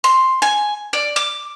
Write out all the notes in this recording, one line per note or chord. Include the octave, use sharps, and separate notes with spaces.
C6
G#5
D5
D6